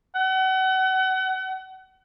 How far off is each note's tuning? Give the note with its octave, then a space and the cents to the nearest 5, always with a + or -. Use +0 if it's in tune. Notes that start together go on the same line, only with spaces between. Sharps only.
F#5 +35